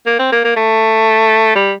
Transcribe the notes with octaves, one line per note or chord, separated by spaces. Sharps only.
A#3
C4
A#3
A#3
A3
G3